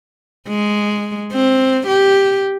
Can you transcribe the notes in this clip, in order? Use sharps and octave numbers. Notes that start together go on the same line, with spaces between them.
G#3
C4
G4